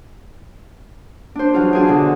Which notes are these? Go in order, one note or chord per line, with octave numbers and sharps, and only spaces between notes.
D4 C5
E3 F#3 F4 F#4 G#4
D4 F#4 G#4 G#5 A5
B2 D3 E3